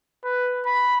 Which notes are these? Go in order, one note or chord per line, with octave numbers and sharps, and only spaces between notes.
B4
B5